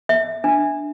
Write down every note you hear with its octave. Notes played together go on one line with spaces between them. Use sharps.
E5
D4